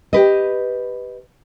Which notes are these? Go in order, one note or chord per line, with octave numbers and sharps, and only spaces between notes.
G4 B4 D#5